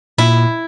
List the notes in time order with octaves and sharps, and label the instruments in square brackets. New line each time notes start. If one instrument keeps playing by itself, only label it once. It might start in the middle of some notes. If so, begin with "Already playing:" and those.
[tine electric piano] A#2 [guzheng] E4